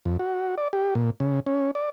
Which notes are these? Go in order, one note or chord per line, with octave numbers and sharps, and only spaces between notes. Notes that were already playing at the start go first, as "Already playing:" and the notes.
F2
F#4
D5
G4
A#2
C#3
C#4
D5